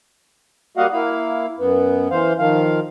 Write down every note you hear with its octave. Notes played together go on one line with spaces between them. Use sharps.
G3 A#3 F#4 D#5 F5 F#5
A#3 E4 F5
F#2 B3
E3 C5 F5
D#3 F3 F5